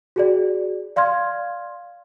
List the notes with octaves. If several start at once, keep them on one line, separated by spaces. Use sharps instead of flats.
F#4 G#4 D5
D5 F5 C6 F6 G#6